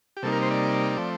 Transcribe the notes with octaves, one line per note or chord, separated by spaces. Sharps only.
G4
C3 G3 A#3 D#4 A4
A#4
C5
D5
F3 A3 C4